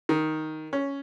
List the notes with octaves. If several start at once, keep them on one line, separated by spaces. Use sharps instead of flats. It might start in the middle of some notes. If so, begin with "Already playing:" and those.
D#3
C#4